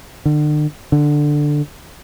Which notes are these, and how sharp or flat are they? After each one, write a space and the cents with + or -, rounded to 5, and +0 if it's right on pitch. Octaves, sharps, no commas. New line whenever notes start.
D3 +40
D3 +5